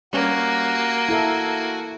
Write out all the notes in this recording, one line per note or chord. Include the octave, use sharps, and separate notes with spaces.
G3 A#3 C#4 F#4 G#5
E4 A4 E5 A#5